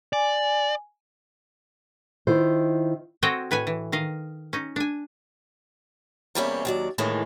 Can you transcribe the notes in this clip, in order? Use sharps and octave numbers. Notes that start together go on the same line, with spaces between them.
D5 G#5
D#3 E4 F4 C5
C4 F#4 A4 C#5 D#5 G5
A2 B4 C#5 G#5
E3
D#3 D#5 F5
C#4 D#4
D4 G#5
E2 C3 G3 A#3 C#4 E4
D#2 F#3 D5
A2 D#3 E3 G#3 A#3